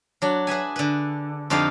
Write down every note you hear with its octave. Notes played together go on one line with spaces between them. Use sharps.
F#3 D4
G#4 B4 E5 G#5
D3 B4
F2 D3 D#4 G4 F5 A5